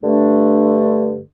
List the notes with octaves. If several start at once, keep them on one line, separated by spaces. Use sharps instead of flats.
G2 D3 A3 D4